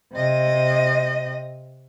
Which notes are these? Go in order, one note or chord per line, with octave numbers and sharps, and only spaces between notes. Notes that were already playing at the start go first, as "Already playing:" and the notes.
C3 D#5